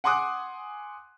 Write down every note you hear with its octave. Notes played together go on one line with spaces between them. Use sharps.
F#5 G#5 C6 D6 D#6 F#6